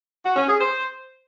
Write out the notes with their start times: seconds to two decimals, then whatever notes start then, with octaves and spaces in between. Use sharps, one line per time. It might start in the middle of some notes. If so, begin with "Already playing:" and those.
0.25 F#4
0.36 C#4
0.48 G#4
0.60 C5